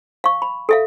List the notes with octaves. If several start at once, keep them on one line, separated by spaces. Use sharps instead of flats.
F5 C#6
B5
A4 E5 F5